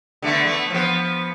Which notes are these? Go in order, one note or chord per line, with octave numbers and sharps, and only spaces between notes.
D3 A3 B3
A3 B3
F3 B3